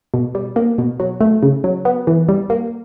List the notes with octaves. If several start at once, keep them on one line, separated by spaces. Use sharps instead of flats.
B2
G3
A#3
B2
F#3
A3
C#3
F#3
B3
E3
G3
A#3